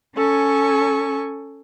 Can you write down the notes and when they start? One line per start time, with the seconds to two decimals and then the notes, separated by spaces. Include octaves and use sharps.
0.15 C#4 A4 G#5 C#6